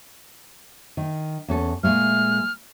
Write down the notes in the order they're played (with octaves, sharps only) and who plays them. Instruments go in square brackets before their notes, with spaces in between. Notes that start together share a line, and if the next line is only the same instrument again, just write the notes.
[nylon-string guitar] D#3
E2 C#4 A4
[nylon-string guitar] A#2 G#3 A3 [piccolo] F6